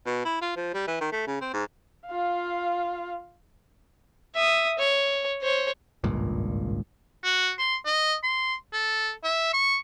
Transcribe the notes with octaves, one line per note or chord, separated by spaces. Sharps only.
B2
E4
F4
F3
G3
E3
D#3
A3
C#3
C4
G#2
F4 F5
E5 D#6
C#5
C5 C#5
G#1 C#2 G2 A#2
F#4
C6
D#5
C6
A4
E5
C#6